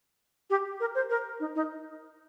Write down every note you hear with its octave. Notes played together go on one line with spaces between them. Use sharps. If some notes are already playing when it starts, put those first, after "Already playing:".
G4
A#4
C5
A#4
D#4
D#4